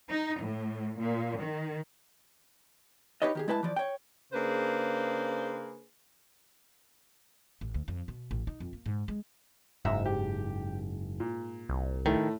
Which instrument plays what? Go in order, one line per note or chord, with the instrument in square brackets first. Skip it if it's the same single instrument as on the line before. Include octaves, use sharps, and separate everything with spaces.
[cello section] D#4
A2
A#2
D#3
[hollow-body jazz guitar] D#4 G4 B4 C#5 D#5
D#3 G4 G#4
G#3 E4 B4 G5 A5
E3 F3 D5
C#5 G5
[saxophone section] C#3 A#3 D4 G#4 B4 C5
[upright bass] A1
D2
F2
B2
A1
D#4
F2
A#3
G#2
G#3
[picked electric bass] F#1 [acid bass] G#2 [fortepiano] E5 A#5
[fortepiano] G4
A#2
[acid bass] C2
[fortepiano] A2 A3 [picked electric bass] D#3